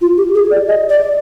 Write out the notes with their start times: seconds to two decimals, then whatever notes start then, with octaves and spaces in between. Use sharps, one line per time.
0.01 F4
0.17 G4
0.34 G#4
0.51 D5
0.68 D#5
0.89 D5